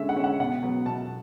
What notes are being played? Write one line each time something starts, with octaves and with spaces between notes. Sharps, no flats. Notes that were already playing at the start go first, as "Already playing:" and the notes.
Already playing: D3 G#3 C#4 E5
F#5
G#3 C#4
F#5
B2 F#5
F#3 B3
B2 A5